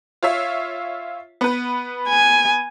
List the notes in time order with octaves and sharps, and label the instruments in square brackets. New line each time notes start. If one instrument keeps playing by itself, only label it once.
[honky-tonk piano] F4 C#5 E5
B3 B4
[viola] G#5